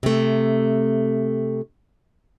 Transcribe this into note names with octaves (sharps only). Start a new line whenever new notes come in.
C3 A3